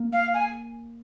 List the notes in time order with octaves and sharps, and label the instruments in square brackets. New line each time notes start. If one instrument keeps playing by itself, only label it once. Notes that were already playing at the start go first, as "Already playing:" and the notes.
Already playing: [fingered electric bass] A#3
[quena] F5
G#5